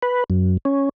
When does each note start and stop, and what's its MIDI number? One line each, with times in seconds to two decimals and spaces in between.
0.02 0.24 71
0.30 0.57 42
0.65 0.89 61